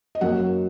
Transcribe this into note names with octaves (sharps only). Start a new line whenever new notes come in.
D#5
F#2 F#3 A#3 F#5